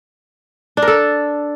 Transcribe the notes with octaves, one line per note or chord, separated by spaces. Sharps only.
D4
A#4
A4